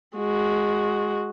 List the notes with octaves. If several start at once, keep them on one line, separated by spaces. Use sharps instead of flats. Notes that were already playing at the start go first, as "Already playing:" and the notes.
G#3 F#4